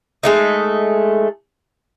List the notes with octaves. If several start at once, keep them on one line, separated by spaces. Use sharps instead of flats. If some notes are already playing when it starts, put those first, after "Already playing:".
G#3 A3 D#4